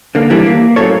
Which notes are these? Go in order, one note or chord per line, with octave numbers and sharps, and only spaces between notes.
D3 A#3
E3 G3 D4
A#3
F#2 A2 A4 C#5